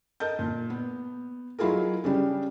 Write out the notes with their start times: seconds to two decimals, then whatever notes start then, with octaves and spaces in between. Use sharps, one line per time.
0.20 A#4 D#5 A5 G6
0.39 A#2
0.70 B3
1.59 F#3 G#3 E4 F4 G#4 A#4
2.04 C#3 G3 C#4 D4 G4